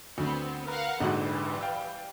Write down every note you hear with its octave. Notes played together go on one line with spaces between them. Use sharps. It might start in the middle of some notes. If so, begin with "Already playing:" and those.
D2 B3 C4
A#4 B4 F5 F#5 A#5
A#1 G#2 D3 E3 G3 F#4
F5 G5